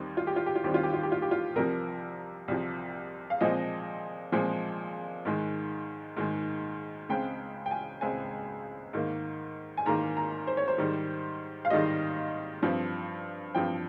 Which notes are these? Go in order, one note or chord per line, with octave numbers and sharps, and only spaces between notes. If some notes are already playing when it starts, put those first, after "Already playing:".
Already playing: D#2 D#3 G3 C4 D#4
F4
G4
F4
G4
F4
D#2 D#3 G3 C4 G4
F4
G4
F4
G4
F4
G4
F4
C2 C3 F3 A#4
C2 C3 F3
F5
A#2 F3 G#3 C4 D#5
A#2 F3 G#3 C4
G#2 D#3 G#3
G#2 D#3 G#3
C#2 C#3 G#3 C4 G5
G5
G#5
C#2 C#3 G#3 C4 G#5
G#2 D#3 A#3
G#5
G#2 D#3 A#3 A#5
A#5
C5
C#5
C5
G#2 D#3 G3
F5
G#2 D#3 G3 D#5
G2 F3 C4
G2 F3 C4 G5